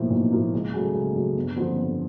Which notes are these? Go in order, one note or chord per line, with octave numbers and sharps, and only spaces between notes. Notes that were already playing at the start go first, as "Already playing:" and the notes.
Already playing: B1 A2 F3 A#3
B1
A2 F3 A#3
C#2
C#3 F#3 A3
C#2
C#3 F#3 A3
G1
F2 D3 F3
G1